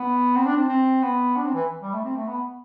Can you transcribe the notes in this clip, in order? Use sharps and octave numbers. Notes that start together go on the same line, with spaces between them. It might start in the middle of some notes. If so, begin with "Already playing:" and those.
Already playing: B3
C4
D4
C4
C4
B3
D4
C4
E3
G3
A3
C4
A3
B3